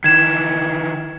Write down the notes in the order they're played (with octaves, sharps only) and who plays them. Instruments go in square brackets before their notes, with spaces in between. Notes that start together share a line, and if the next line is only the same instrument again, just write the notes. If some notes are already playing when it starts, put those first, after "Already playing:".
[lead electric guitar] D#3 E3 [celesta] G#6 E7